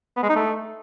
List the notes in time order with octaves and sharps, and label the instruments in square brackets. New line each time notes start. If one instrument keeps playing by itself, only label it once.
[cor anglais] B3
G#3
D#4
A3